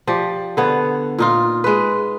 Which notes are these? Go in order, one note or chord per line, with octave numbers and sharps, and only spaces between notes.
F3 G4 D5
D3 B3 C#5
A#2 D#4 F4
G#3 B4